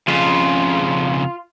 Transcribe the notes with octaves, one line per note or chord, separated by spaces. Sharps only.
F2 C#3 F4